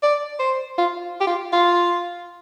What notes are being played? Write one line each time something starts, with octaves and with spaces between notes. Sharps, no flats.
D5
C5
F4
G4
F4
F4